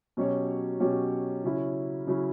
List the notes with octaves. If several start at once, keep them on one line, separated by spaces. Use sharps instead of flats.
B2 F#3 C#4 G4 C#5
B2 F#3 C#4 G4 C#5
C#3 F#3 C#4 E4
C#3 F#3 C#4 E4